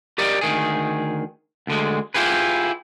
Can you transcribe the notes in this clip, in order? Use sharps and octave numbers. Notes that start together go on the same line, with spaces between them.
G4 A#4 D5 D#5
D2 D#3 G#4
D2 D3 G#3
E4 F4 G4 G#4 B4